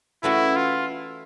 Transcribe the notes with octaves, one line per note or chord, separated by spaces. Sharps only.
E3 A3 C#4 E4 F#4 A4
F4